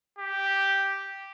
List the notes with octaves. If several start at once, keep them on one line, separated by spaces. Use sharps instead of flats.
G4